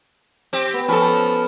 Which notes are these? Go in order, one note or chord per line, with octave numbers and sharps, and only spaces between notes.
C4 G4
B3
F3 C#4 A4 B5